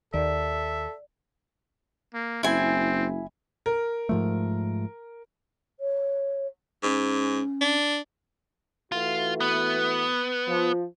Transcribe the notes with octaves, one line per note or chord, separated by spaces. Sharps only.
D#2 D#3 A4 D5 E5
A#3
F#1 C4 E4 G#5
A#4
G#2 F3 A3
C#5
G#2 C#4
D4
E3 A3 F4 F#4
B3
F3